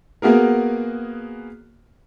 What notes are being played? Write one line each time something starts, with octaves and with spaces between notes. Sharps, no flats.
A#3 B3 F#4 G#4 A#4